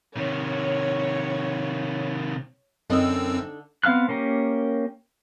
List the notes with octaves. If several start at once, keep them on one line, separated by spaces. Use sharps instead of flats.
C3 D#3 C#5
F#2 D3 C4 D#4 D#5 E6
B3 C4 F5 F6 F#6
A#3 C#4 G4 A#4